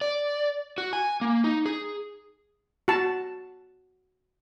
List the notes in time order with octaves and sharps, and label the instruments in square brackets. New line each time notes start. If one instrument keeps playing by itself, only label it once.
[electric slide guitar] D5
F#4
G#5
A#3
D#4
G#4
[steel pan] F#4 A5